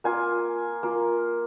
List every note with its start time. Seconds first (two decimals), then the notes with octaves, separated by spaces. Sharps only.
0.04 A#3 F4 G#5
0.83 A#3 F4